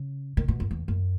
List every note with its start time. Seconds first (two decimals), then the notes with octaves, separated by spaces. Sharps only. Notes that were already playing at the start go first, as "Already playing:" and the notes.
Already playing: C#3
0.37 D#3
0.48 B2
0.60 F#2
0.71 E2
0.88 F#2